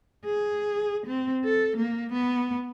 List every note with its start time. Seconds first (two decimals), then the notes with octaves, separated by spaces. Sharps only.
0.25 G#4
1.06 C4
1.45 A4
1.77 A#3
2.12 B3